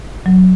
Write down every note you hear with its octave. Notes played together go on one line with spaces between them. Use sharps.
F#3